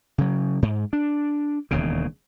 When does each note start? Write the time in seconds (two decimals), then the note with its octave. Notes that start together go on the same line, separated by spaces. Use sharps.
0.18 C#3 F#3
0.62 G#2
0.93 D4
1.71 E1 D#2 C#3